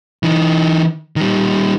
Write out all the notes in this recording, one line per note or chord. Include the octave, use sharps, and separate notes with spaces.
E3 D#4
D#3 G3